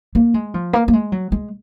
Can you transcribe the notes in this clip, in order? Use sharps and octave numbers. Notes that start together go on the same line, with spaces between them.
A#3
G#3
F3
A#3
A#3
G#3
F#3
G#3